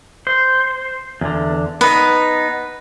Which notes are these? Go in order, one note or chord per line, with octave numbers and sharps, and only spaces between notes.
C5
E2 D3
B3 D#4 B4